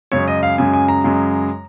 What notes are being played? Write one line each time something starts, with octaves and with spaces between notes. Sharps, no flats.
F#2 C#3 G#3 C#5
D#5
F5
F#2 C#3 G#3 G#5
G#5
A#5
F#2 C#3 G#3